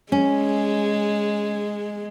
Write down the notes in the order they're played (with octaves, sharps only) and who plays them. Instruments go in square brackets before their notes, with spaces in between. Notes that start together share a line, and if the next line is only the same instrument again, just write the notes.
[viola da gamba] G#3 [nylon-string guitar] C#4